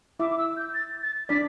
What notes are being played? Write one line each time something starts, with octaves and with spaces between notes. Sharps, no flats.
E4 E5 D6
D6
E6
G6
A6
A6
D4 D5 B6